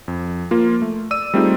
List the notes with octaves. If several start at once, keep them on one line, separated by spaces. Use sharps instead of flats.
F2
F3 A#3 F4
A3
D5 E6 D#7
G3 A3 C4 D#4 F4 G#4